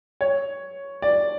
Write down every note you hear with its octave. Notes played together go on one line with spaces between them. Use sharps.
C#5
D5